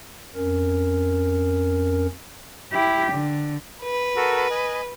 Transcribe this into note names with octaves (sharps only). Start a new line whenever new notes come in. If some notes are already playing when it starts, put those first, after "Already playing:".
F2 C#4 A#4
E4 G4
D3
B4
F#4 A4 A#4
D#5 G#5